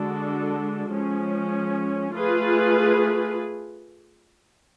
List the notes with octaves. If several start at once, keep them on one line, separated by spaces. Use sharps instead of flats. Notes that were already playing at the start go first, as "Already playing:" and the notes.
Already playing: D3 G#3 D4 F#4 A4
F3 G#3 C#4
A3 F4 G#4 B4